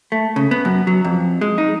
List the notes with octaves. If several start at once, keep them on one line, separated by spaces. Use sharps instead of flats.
A3
C#3
B3
F#2
F#3
F2
G#3
D#4